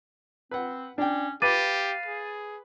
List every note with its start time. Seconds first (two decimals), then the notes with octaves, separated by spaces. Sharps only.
0.51 C4 B4 F#5
0.98 C#4 D4 G5
1.42 G4 B4 F5 D6 A6 D#7
2.06 G#4